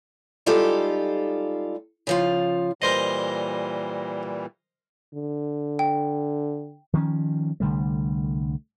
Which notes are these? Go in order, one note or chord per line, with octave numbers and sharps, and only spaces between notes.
G3 G#3 D#4 F4 G4 A4
C#3 F3 F4
A#2 E3 G3 A#4 C5 D#5
D3
G5
D#3 F3 G3 C#4
C2 D3 G3 A3